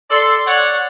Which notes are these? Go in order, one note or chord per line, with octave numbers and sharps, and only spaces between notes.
A4 D5 C6
C#5 D5 F#5